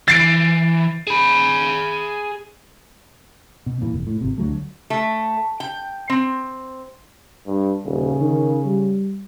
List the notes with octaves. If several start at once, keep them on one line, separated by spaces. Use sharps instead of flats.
E3 A6 C7 D7
G#4 B5
B2
E2 A#2 E3
F1
A2
G#1 C3
D2 F#3 A3
A3
G5
C4
G2
D#1 C#3
D#3
G3